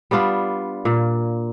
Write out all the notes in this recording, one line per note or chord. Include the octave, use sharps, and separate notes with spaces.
G3 B3 D4 F4
A#2